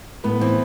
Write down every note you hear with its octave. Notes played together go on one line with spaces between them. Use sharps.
A2 B3
E3 C4